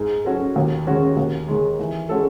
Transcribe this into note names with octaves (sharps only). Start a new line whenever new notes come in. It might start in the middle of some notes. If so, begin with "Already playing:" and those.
Already playing: G#2
F#3 C#4 F#4 A4
D#2
D#3 G#3 C#4 F#4
D#2
D#3 G#3
E3
G#3 C#4 F#4 A4